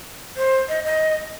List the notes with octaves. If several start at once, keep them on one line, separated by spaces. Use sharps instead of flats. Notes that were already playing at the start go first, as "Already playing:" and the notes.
C5
D#5
D#5